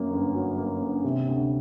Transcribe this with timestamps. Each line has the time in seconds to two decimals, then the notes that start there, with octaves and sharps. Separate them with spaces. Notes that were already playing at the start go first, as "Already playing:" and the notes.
Already playing: F#2 A#3
0.11 G1
0.34 F#3
0.58 A#3
0.80 G1
1.04 C3
1.27 D2